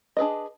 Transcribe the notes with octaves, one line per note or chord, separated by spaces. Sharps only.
D4 G#4 B4 D#5